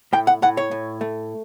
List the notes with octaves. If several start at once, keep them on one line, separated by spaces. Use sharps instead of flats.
A2 G5
F#5
A2 F#5
C#5
A2
A3